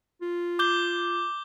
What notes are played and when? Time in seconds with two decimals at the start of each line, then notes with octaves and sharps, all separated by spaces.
0.22 F4
0.59 D6 G6 G7